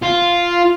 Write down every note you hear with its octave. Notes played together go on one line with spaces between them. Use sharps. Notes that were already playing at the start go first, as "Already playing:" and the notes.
F4